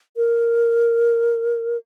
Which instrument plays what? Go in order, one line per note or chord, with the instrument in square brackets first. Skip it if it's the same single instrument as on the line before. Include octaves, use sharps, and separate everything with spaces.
[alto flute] A#4